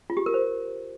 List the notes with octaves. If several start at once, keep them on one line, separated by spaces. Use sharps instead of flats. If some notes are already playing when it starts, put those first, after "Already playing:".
F4
G4
A#4
C5